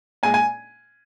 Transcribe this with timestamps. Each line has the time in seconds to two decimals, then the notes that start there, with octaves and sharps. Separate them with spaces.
0.23 A#2 G#3 G#5
0.34 G#5